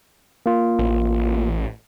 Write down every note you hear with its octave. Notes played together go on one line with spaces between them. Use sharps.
A#3 F4
A1